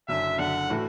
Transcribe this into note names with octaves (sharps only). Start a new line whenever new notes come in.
F#1 F#2 D3 E5
F#1 F#2 D3 F#5
A2 E3 A3 F#4